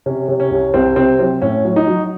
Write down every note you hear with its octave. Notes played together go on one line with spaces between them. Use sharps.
C3 C#4
C3
C#4
C2
C2 C4
C3 C4
F#3 C4
A2 C#4
F#3
D#4
F#3